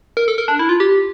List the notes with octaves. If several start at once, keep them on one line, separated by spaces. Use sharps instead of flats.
A#4
A4
A#4
D4
E4
F4
G4